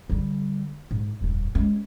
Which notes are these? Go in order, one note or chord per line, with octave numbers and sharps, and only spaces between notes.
D3 G3
G#2
D#1 F2
G#3 C#4